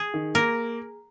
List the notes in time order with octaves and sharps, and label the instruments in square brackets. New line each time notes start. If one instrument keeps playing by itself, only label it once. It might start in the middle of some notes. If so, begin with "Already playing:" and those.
Already playing: [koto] G#4
[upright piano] D#3
[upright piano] A#3 [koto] A#4